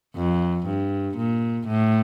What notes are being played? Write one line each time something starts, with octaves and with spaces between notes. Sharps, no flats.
F2
G2
A#2
A2